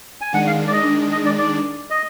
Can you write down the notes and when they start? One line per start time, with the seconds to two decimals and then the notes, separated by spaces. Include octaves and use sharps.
0.21 G#5
0.33 D#3 G#3 D4 F#5
0.47 F5
0.67 D5
0.73 D#5
1.12 D#5
1.25 D5
1.38 D5
1.90 D#5